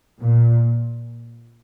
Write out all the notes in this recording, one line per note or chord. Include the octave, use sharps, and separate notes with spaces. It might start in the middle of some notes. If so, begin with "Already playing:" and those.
A#2